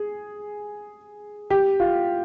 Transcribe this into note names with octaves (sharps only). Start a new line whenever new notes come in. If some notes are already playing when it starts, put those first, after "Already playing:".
Already playing: G#4
G4
F4